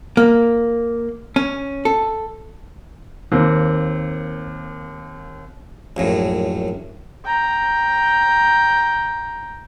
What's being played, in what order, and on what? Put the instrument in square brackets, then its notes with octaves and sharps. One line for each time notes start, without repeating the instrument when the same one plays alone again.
[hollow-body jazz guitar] A#3
C#4
A4
[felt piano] D#2 A#3 C4
[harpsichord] A#1 F#2 A2
[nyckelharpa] G5 A#5